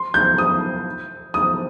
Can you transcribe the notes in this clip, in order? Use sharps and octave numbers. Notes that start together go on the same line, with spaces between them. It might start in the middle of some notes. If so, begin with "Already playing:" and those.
Already playing: C6
G6
D#6
D#6